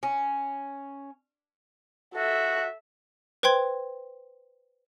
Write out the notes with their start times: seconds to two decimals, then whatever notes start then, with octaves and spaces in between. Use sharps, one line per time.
0.03 C#4
2.15 F#4 A4 E5
3.43 B4 C5 G5 C6 G#6